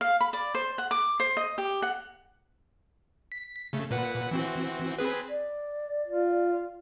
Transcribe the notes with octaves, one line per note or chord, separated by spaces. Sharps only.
F5
B5
D5
C5
F#5
D6
C5
D#5
G4
F#5
B6
C#3 A3
A#2 B4 F#5
E3 C4 F#4
C4 G#4 B4
D5
F4